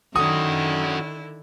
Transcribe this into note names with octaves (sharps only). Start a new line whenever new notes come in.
D3 D#3 C#4 E4 F#4 D#6